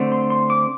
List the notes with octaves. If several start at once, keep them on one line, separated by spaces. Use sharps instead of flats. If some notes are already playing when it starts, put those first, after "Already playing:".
Already playing: D3 A3 C4
C6
C6
D6